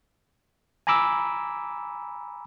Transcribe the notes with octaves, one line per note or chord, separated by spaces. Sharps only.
G#5 A#5 B5 D6 E6